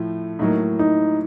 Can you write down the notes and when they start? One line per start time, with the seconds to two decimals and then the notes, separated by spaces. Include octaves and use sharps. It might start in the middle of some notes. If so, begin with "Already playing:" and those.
Already playing: A2 F3 A3
0.39 A2 F#3 A#3 D#4
0.79 D#4